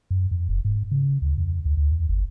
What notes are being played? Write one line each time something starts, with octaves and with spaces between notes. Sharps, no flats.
F#2
F2
F1
G#2
C#3
D2
F2
D2
D2
E2
G1